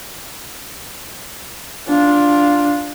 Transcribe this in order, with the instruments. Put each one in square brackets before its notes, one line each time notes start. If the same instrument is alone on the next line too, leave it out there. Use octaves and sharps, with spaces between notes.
[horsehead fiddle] D4 F4